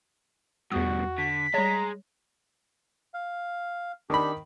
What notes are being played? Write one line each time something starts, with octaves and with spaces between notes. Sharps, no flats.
E2 G2 B2 F#4 D#6
D3 B6
G3 G#3 C#5 A#5
F5
D#3 D4 G4 B5